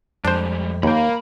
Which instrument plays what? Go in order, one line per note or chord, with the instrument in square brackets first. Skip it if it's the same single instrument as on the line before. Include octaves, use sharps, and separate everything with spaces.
[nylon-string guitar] F2 [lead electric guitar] G3 G#3 [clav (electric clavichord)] D4 C5
[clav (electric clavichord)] D#2 G5 [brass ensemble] A#3 [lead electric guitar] B5